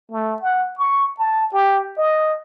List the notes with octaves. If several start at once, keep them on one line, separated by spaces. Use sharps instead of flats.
A3
F#5
C#6
A5
G4
D#5